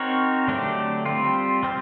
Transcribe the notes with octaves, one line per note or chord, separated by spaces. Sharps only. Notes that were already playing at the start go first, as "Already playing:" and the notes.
Already playing: C4 D#4 F#4 A#4 C#5
D3 F#3 A3 D4 G4
G3 C4 F4
G3 C4 F4